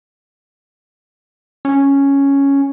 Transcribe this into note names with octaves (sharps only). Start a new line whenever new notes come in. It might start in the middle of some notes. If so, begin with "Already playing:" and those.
C#4